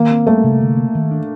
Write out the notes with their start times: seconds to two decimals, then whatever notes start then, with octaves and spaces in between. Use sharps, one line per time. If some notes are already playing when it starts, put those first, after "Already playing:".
Already playing: D#3 A#3
0.11 C4
0.27 G3 A3
0.44 C3
0.61 D3
0.77 A#3
0.95 D#3
1.11 D4